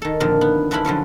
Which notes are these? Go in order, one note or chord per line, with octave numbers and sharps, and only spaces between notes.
D#3 A4
F2 A#2 D3 D#3
B3
G2 D3 C#4 D4 E4 B5
D3 F3 F#3 C#4